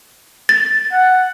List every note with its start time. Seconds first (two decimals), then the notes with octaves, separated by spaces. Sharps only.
0.49 A6
0.92 F#5